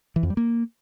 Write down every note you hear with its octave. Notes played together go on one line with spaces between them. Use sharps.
E3
F2
G3
A#3